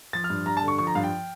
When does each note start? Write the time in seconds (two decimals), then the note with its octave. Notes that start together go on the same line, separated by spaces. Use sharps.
0.13 F3 A6
0.24 F6
0.30 G2
0.46 G2 A#5
0.57 A5
0.62 D3
0.68 C#6
0.78 F3 C#6
0.87 A#5
0.95 G2 F5
1.04 G5